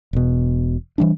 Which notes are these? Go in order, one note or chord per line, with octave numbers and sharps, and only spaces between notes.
E1 B2
E3 G3 D4